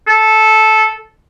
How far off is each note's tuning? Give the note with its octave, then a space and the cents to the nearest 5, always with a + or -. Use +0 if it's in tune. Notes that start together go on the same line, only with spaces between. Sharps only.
A4 -10